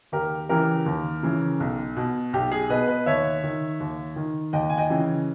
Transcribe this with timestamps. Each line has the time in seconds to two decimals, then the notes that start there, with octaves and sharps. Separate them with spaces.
0.12 D#2 G4 A#4
0.49 C#3 E3 G4 A#4
0.86 D#2
1.23 C#3 E3
1.60 B1
1.96 B2
2.33 B1 G4
2.52 G#4
2.69 B2 B4 D#5
2.88 B4 D#5
3.06 D#2 C#5 E5
3.43 D#3
3.80 D#2
4.16 D#3
4.53 D#2 D#5 G5
4.70 G#5
4.78 D#5 G5
4.90 C#3 E3